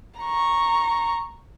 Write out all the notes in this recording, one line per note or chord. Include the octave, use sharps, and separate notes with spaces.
A#5 C#6